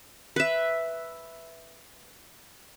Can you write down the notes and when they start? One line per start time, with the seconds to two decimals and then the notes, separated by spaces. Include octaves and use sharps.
0.36 B4 E5